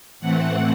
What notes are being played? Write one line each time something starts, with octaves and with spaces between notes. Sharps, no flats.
A2 E3 A3 C4 F#5